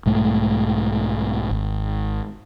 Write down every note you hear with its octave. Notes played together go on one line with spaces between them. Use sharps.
B1 G#2 A3
G#1